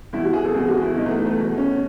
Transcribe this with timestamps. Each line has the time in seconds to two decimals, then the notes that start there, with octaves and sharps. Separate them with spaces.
0.13 E2 B2 E4
0.24 F#4
0.33 G#4
0.44 A4
0.54 E2 B2 G#4
0.68 F#4
0.82 E4
0.96 E2 B2 D#4
1.06 A3
1.16 A3
1.27 A3
1.38 E2 B2
1.58 C#4